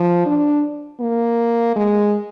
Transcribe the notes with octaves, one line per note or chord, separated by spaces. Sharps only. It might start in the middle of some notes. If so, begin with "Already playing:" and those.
Already playing: F3
D4
A#3
G#3